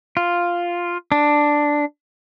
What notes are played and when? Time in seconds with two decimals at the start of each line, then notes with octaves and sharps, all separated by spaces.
0.17 F4
1.12 D4